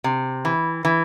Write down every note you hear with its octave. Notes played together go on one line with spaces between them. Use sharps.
C3
E3
E3